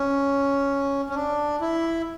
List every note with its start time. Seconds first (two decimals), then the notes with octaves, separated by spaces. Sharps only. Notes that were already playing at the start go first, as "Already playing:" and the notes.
Already playing: C#4
1.09 C#4
1.15 D4
1.61 E4